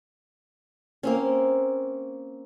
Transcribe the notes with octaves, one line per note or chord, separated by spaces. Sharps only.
A#3 C4 C#4